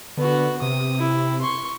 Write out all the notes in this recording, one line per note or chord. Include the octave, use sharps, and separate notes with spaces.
D3 B3 F#4
C3 D#6
E4
C6 C#6